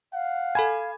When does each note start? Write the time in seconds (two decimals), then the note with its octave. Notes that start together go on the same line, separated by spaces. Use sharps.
0.13 F5 F#5
0.55 A4 G#5 B5 G#6